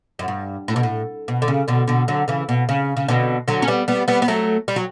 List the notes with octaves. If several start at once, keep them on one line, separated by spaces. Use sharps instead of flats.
F#2
G2
A2
B2
A2
B2
D3
C#3
B2 D3
B2 D3
D3 F#3
C#3 E3
B2
C#3
C#3
B2 D3
D3 F#3
C#4
G3 B3
G3 B3
G3 B3
B3
F#3 A3
G3
F#3